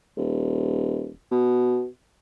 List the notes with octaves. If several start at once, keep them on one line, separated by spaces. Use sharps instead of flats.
D#1
B2